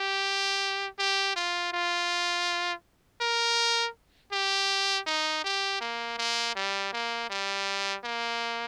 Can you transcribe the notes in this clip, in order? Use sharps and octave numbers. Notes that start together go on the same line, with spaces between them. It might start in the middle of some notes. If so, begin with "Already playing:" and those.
Already playing: G4
G4
F4
F4
A#4
G4
D#4
G4
A#3
A#3
G3
A#3
G3
A#3